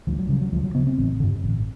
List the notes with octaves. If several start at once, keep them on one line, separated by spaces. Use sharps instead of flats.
D2 F3
F#3
C#3 G3
F#3
D2 F3
F#3
C#3 B3
C4
A1
G2 D3
A1